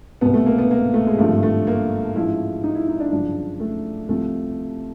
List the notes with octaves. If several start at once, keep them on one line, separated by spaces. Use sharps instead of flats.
C2 B2 B3
A3
A#3
B3
A#3
A3
G#3
G#1 G2 D3 F3 A3
A3
A#3
A1 G#2 F3 E4
D#4
E4
D#4
D4
G1 F#2 C#3 F3 D4
A3
C2 C3 F3 A3